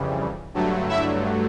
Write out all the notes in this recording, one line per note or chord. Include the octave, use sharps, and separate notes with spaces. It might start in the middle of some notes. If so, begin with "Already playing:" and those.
Already playing: F2 C#3 E3 G3
G2 D3 F#3 A3
E4 E5